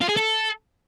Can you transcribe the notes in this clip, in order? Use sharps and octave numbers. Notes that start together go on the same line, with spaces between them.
F4
G#4
A4